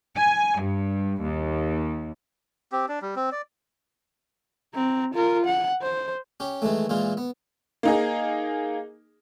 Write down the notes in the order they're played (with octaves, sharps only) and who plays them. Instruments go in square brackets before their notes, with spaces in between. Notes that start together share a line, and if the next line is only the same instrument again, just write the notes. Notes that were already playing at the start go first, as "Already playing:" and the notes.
[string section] G#5
G2
D#2
[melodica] C4 G4
D4
G3
C4
D5
[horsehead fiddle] C4 A#5
F4 A#4
F#5
C5
[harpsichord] C#4 G4
D#3 E3 G#3 A3
A#2 E3 G#3 F4
B3
[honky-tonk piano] A#3 D#4 G#4